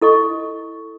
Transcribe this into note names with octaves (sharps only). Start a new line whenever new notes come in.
E4 A4 D#5 C#6